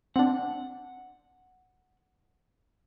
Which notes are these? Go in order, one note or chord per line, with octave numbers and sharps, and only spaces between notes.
C4 D4 F#5